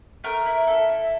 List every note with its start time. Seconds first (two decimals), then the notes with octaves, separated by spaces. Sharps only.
0.24 A3 A#4
0.46 E4
0.67 A4
0.90 E4